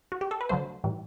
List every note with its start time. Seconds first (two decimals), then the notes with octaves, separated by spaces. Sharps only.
0.12 F#4
0.21 G4
0.31 A4
0.41 B4
0.49 D3 F#3 A3 C5
0.84 A2 E3 G3